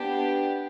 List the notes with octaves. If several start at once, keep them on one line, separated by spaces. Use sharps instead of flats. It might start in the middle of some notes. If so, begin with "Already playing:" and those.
Already playing: B3 D4 G4